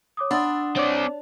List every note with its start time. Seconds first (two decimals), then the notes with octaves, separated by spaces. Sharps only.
0.17 C#5 D6 D#6
0.31 D4 F#5 B5 C6 D#6 E6 A6
0.76 C4 C#5 D5